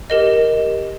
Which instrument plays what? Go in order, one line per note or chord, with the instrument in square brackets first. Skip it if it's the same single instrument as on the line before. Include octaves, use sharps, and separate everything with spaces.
[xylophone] G4 A#4 D#5